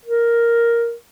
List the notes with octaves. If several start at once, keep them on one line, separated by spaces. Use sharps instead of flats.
A#4